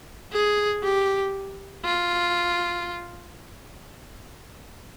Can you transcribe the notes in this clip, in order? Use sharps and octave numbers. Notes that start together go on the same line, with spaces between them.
G#4
G4
F4